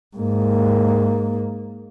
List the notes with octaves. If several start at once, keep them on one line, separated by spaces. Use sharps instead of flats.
G#2 A#3